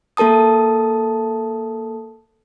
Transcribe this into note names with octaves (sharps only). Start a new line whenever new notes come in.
A#3 A4 A#4 A5 D#6